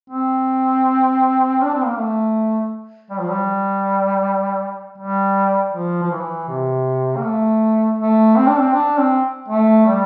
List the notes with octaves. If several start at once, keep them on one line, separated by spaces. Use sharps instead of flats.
C4
D4
C4
A#3
A3
G3
F3
G3
G3
F3
F3
E3
C3
A#3
A3
A3
C4
D4
C4
D4
C4
A3
G3